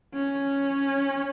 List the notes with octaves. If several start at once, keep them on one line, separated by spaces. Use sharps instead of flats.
C#4